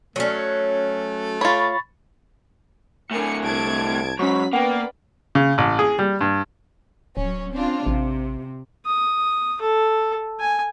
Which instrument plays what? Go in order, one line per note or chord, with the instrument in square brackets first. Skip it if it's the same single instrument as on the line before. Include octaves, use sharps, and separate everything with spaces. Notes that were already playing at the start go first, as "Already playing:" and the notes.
[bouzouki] F#3 C#4 [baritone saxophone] A3
[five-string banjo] F4 C#5 [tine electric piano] B5 C#6 A6
[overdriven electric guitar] A2 D3 [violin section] A#4 G#5 C#7
[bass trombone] C2 [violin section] A5 G#6 D7
[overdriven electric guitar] G#2 [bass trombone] F#3 [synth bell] C#4 C#6 [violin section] B5 B6
[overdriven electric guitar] A#3 [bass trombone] B3 [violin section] B4 D5 [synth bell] F#5 G5
[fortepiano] C#3
A1
G#4
G3
G2
[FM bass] D1 [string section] F#3 C#4
[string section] C4 D4 F4
[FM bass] A1 [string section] C3
[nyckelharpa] D#6
A4
G#5